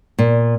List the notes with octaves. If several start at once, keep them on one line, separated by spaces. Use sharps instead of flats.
A#2